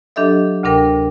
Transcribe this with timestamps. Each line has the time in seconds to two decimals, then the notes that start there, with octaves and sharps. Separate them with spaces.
0.16 F#3 D4 G4 A4 D#5 E5
0.63 D2 C3 D4 A#4 G5